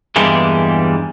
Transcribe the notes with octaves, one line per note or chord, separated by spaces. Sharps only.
E2 G2 E3 G3 G#3 A#3